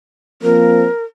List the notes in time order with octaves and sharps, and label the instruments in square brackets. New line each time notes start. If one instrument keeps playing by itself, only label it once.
[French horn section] F3 A#3 C4 [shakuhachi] A#4